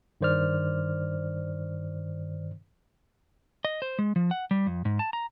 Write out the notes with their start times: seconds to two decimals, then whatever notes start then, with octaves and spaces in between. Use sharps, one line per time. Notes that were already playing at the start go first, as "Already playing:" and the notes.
0.21 G2 D#3 C5 D5 F6
3.65 D#5
3.82 C5
3.99 G#3
4.16 F3
4.31 F#5
4.51 G3
4.67 F2
4.85 G#2
4.99 A5
5.13 A#5